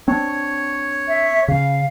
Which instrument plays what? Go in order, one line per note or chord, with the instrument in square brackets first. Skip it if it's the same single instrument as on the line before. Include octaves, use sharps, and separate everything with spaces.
[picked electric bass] C4 D4 [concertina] C#5
[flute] E5
[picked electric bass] C#3 [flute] F5